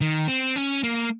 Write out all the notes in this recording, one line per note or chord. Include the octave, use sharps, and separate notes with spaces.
D#3
C4
C#4
A#3